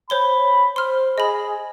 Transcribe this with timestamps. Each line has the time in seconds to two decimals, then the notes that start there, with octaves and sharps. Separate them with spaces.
0.10 C5 C#5 B5 G7
0.76 C5 C6 F6
1.18 G#4 D#5 B5